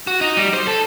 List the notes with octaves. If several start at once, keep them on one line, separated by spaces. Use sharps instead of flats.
F#4
D#4
G3
C5
A4